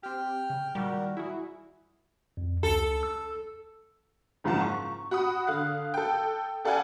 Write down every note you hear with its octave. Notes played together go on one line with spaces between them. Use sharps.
C4 G4 G5 F6
C#3
A#2 D#3 G3 F#4 A#4
E4 F#4 G#4
F2
C#2 A4
E6
F#1 G#2 F3 F5 F#5 A5
C#6
F#4 F#5 B5 D#6
D3 F5 F#6
A4 G5
G4 A4 D5 F5 F#5 G#5